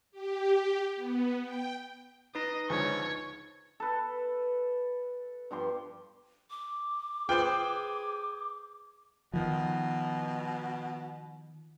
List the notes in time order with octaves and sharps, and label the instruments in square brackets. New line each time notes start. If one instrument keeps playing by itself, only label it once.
[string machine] G4
B3
G5
[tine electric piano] D#4 B4 [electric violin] D#5
[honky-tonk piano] C#2 D3 F3 [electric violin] C#5
[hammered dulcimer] A4 B4
G2 F3 G4 C6
[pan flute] D6
[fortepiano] F4 B4 C5 [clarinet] G#4 [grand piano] G5
[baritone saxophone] B2 [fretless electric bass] D#3 F3